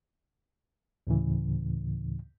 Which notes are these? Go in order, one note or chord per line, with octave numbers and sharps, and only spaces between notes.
D2 A2 C#3 E3